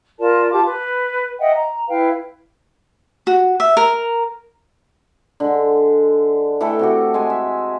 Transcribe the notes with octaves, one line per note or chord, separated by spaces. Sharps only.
F4 A#4 D5 A5
F4 G4 A5 D6
B4
D#5 E5 F#5 G5
A#5
E4 B4 F5 G5
F#4
E5
A#4
D3 G#3
E3 A3 A4 G5
C3 F#4 G4
G#3 G#5
E5